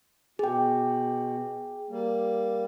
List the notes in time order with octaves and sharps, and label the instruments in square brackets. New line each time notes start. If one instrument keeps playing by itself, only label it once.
[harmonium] B2 [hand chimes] G#4 G5
[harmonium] G3 A#3